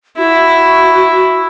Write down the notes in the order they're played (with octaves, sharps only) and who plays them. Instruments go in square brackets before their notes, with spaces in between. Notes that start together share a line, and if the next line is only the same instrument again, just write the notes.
[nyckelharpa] E4 [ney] F#4